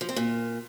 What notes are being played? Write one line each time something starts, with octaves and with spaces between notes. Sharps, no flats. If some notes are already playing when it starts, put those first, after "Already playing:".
F3
C4
A#2